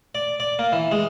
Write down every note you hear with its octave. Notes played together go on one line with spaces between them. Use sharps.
D5
D5
A#3
E3
G#3